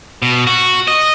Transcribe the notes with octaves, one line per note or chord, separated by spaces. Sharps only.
B2
F#4
D#5